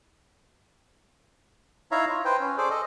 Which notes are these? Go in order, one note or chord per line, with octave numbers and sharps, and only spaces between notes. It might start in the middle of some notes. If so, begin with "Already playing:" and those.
D#4 E4 C#5 E5 F5 A#5
F4
B4 C5 G5
C#4
G#4 A4 C5 D5 D6
A4 D#5